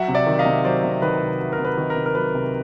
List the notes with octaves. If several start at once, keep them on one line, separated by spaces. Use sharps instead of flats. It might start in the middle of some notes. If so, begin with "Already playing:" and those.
Already playing: F#3 E5 F#5
C3
D5 E5
D#3
D#5 F5
C3
F#3 C5 D5
C3
D#3 B4
C3
F#3
A#4
C3
B4
D#3
A#4
C3
A#4
F#3 B4
C3